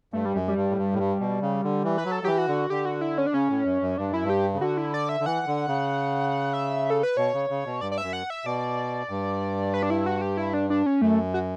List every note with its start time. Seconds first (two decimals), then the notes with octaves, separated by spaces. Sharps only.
0.13 G2 A3
0.25 G3
0.35 F#2
0.48 G3
0.56 G2
0.70 A2
0.77 G2
0.93 A2
0.98 G2
1.20 B2
1.42 C#3
1.63 D3
1.84 E3
1.98 B4
2.05 F#3
2.11 A4
2.23 E3 F#3 G4
2.38 F#4
2.48 D3
2.70 D3 G4
2.85 F#4
3.01 E4
3.18 C#4
3.26 D4
3.34 C#3 C#4
3.49 A2
3.65 F#2
3.82 F#2
3.98 G2 D4
4.11 F#2 E4
4.24 G2
4.30 G4
4.54 C#3
4.61 D3 F#4
4.78 E4
4.94 D5
5.09 E5
5.20 D3
5.25 E3 F#5
5.47 D3
5.68 C#3
6.53 E5
6.90 A4
7.03 B4
7.17 B2 C#5
7.33 C#3
7.50 C#3
7.66 B2
7.81 G2 D5
7.92 D5
7.98 E5
8.03 F#2
8.13 F#5
8.30 E5
8.45 B2 D5
9.10 G2
9.74 B4
9.83 D4
9.90 E4
10.06 F#4
10.21 G4
10.37 E4
10.54 D4
10.70 D4
10.86 C#4
11.02 F#2 A3
11.34 F#4